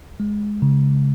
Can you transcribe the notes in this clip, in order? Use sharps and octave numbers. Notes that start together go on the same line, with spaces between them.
G#3
C#3